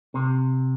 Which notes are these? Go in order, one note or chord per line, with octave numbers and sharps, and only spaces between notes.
C3